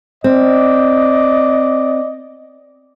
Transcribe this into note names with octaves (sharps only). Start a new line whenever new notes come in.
C4 D5 D#5